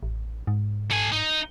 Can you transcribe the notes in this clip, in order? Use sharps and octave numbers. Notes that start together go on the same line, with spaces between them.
A1
G#2
A3 G#5
D#4